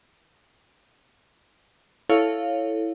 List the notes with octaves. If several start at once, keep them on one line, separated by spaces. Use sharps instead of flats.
E4 A4 C#5 F5